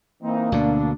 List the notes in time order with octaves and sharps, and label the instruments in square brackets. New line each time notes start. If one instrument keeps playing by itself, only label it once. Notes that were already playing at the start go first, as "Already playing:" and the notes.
[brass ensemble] E3 C4 D#4 [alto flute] A#3
[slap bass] D2 B2 D3 [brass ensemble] D4